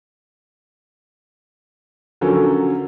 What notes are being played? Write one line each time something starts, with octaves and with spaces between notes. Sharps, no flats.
D3 F3 F#3 C#4 A4 A#4